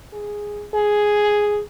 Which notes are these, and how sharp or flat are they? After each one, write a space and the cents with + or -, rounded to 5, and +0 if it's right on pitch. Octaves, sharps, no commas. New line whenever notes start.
G#4 -5
G#4 +0